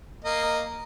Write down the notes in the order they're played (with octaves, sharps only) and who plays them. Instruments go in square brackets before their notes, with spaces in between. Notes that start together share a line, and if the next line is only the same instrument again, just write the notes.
[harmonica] A#3 D#5